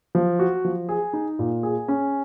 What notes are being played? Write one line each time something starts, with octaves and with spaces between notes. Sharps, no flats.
F3
F#4
F3
G#4
D#4
A#2
G#4
C#4